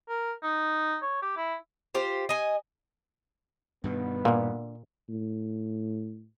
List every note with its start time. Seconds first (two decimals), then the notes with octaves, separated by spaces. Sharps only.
0.09 A#4
0.43 D#4
1.02 C#5
1.22 G4
1.37 E4
1.94 F4 G4 C5
2.29 D#5 G#5
3.84 G2 B2 D#3 B3
4.25 A#2 D3 A#3
5.09 A2